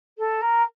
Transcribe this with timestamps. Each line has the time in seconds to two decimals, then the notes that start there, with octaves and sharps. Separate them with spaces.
0.18 A4
0.41 A#4